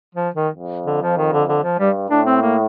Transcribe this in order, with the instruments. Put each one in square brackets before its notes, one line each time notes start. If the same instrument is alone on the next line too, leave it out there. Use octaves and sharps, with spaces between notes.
[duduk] F3
D#3
[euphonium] F2
[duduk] D3
F3
D#3
D3
D3
F3
[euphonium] G2 [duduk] G3
[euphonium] A2 [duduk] D4
[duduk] C4
A#3